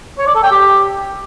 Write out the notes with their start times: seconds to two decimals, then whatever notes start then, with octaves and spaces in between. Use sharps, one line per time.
0.19 C#5
0.27 D5
0.35 A4
0.43 G5
0.52 G4